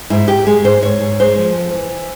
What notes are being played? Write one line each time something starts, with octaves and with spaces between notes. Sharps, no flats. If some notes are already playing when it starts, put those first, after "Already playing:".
G#2 E4
G#2 G4
G#3 G#4
G#2 C5
G#2 C#5
G#2
G#3 C5
F3
F2
E3
E3